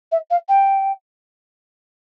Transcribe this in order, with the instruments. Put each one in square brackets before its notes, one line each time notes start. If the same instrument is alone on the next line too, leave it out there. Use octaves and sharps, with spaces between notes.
[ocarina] E5
F5
G5